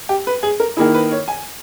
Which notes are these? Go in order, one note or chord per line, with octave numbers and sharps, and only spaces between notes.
G4
B4
G#4
A#4
D#3 A#3 E4 G#4
B4
C#5
G#5